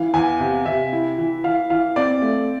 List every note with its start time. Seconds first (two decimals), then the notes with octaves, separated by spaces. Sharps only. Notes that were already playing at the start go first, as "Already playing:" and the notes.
Already playing: E3 F5
0.14 E2 G#5
0.40 C3
0.66 C3 E5
0.93 E4
1.18 E3
1.44 E3 F5
1.70 E3 F5
1.96 C4 D5
2.22 A3